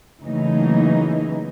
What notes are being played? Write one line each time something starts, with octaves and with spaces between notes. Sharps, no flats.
C#3 E3 F#3 A3 A#3 D#4